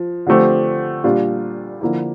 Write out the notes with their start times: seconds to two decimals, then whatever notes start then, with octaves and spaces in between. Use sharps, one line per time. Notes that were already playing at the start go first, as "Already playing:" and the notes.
Already playing: F3
0.27 D3 F3 A3 C4 G4
1.04 A#2 G3 D4 F4
1.81 D3 F3 A#3 E4